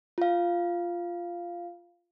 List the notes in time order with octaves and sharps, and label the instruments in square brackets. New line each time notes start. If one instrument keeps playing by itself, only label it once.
[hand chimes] F4 F5